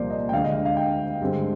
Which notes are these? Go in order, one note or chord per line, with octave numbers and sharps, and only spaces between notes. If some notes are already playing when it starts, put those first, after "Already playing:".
Already playing: C2 A#2 F3 A#3 C5 D5
D#5
G5
D2 D3 G#3 F5
D#5
F5
F5
G5
G2 D3 G#3 C4